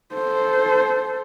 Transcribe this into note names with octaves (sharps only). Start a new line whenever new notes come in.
A4 C5